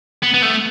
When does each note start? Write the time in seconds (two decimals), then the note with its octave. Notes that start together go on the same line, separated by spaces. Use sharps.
0.23 B3
0.34 B3
0.43 A3